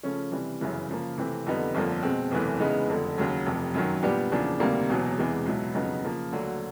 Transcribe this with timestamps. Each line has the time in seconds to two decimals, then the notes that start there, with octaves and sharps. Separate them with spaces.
0.03 C#3 F3 A3 C#4
0.32 C3 E3 G3
0.61 G1 F#2 C#3 E3
0.90 C#3 F3 A#3
1.18 C3 E3 A3 C4
1.46 F2 D3 G3 B3 D#4
1.74 G1 F2 D3 F3 A#3
2.03 B2 G#3 C4
2.31 F#1 E2 C3 E3 A3
2.60 C#3 E3 G#3 B3 D#4
2.89 F1 F2 D3
3.18 D#2 C#3 F#3
3.46 F1 F2 C3
3.74 F#2 D#3 F#3
4.03 A#2 G3 B3 D4 G4
4.32 E2 C#3 F3 A#3 D4
4.60 D2 C3 D#3 G3 A#3
4.89 E1 E2 B2 F#3
5.18 E2 C3 E3 G#3
5.46 C#2 B2 F#3 B3 E4
5.74 F2 C#3 F#3 B3 D#4
6.04 C#3 F3 A#3
6.32 D2 D3 F#3 A#3